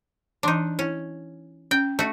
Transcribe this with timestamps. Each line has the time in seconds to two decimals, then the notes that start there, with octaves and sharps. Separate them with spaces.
0.43 E3 D4 D#4 C6 D6
0.79 C#4 E4
1.71 C#4 G5
1.99 A3 F#4